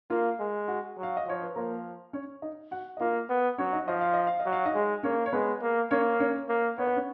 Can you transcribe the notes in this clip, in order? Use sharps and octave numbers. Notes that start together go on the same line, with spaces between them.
A#3 F4
G#3
F#4
F#3
F5
D#5
F3 C#5
B4
F3 A#3 A#4
C#4 C#5
D#4 D#5
F#4 F#5
D#5
A#3 F4 F5
B3
F#3 C#4 C#5
D#4 D#5
F3 D#5
F5
D#5
F5
D#5
F#3
F5
D#4 D#5
G#3
A#3 C#4 C#5
C#5
G#3 B3 B4
A#3
A#3 C#4 C#5
C#4 C#5
A#3
B3 C#5
B4
C#4 C#5